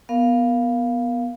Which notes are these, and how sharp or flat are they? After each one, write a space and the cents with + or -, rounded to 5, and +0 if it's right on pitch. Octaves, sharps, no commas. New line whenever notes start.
B3 -10 A#4 +0 F5 +0